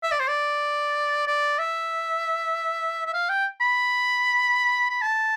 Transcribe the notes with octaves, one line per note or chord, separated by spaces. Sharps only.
E5
D5
C5
D5
D5
E5
E5
F5
G5
B5
B5
A5